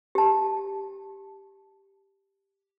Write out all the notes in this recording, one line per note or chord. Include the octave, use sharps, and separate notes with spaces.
G4 A5